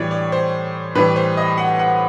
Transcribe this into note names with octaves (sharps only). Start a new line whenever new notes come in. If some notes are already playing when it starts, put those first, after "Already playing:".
Already playing: A2 E3 G3 C#5 D5
D5
C5
A2 E3 G3 B4
C5
D#5
F#5
F#5